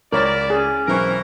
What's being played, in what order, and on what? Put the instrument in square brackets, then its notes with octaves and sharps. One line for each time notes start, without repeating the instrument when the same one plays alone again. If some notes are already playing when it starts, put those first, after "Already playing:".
[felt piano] C#2 A6 [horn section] E4 D5 [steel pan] A#4 C#5
[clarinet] C#4 [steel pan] G#4
[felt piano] B1 C4 C#6 [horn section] E3 A#4